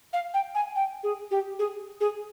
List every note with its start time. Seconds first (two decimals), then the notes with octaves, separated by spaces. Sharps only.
0.13 F5
0.34 G5
0.55 G#5
0.76 G5
1.03 G#4
1.31 G4
1.59 G#4
2.01 G#4